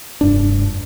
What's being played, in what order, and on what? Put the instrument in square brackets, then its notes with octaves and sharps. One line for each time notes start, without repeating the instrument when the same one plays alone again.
[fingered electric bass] F1 G2 D4